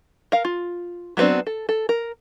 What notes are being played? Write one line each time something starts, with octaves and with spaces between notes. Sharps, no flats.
A#4 F5
F4
F#3 A3 B3 C4 D4
A4
A4
A#4